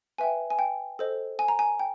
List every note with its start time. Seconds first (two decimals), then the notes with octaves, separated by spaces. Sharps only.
0.18 B4 E5 G5 G#5
0.50 G#5
0.59 G5
0.99 A4 C5 D#5
1.39 G#5
1.48 A#5
1.59 G#5
1.79 G5